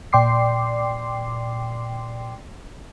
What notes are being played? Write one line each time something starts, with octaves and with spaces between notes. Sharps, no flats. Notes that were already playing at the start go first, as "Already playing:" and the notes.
A#2 D5 G5 C6 D6 C7